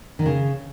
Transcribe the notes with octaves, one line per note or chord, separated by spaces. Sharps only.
D#3
C#3